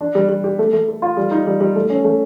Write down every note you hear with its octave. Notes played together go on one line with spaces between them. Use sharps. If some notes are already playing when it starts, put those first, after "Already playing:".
D4
G3
G3
G4
A3
A3
A4
F4
G3
D#4
G3
G3
A3
C#4
A3